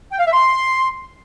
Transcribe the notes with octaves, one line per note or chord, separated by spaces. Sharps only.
G5
F5
E5
C6